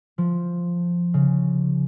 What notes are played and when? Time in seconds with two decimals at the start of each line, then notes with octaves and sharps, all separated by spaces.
0.18 F3
1.14 C#3